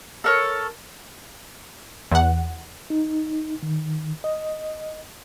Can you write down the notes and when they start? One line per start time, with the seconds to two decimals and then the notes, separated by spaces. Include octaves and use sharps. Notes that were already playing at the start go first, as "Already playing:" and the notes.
0.24 A4 A#4 C#5
2.12 E2 F#5
2.90 D#4
3.63 D#3
4.24 D#5